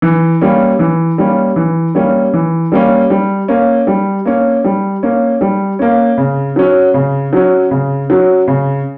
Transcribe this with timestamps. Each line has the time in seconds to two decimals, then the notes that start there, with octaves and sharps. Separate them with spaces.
0.02 E3
0.41 G3 A#3 C#4
0.79 E3
1.18 G3 A#3 C#4
1.56 E3
1.95 G3 A#3 C#4
2.34 E3
2.72 G3 A#3 C#4
3.10 G3
3.48 A#3 C#4
3.87 G3
4.25 A#3 C#4
4.64 G3
5.03 A#3 C#4
5.41 G3
5.79 A#3 C#4
6.18 C#3
6.56 F#3 C#4
6.94 C#3
7.33 F#3 C#4
7.71 C#3
8.10 F#3 C#4
8.48 C#3